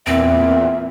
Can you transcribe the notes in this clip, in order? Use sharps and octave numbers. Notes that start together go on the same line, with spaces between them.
E2 A#2 C4 E5